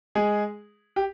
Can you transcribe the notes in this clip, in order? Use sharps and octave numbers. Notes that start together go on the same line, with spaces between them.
G#3 G#4
G4